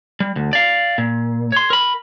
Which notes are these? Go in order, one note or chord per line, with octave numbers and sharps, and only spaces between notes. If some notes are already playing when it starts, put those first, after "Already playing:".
G3
D2
D5 F5
A#2
C#5 C6
A#4 B5